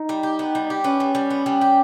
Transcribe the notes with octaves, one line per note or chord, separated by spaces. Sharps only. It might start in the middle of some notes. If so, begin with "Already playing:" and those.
Already playing: D#4
G3
G4
B3
G3
G4
B3 C#4
G3
G3
B3
G3
G4